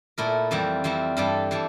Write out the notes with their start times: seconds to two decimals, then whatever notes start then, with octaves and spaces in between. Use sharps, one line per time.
0.18 A#2 A3 E4 A#4
0.51 F2 E3 G3 C4
0.84 F2 E3 G3 C4
1.17 G2 E3 G3 D4 A4
1.51 E3 G3 D4